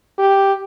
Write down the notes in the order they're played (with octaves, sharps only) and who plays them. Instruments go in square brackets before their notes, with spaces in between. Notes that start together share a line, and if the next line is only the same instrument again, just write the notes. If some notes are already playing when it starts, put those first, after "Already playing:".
[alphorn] G4